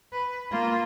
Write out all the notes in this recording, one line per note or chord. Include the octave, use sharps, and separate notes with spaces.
B4
A#3 F4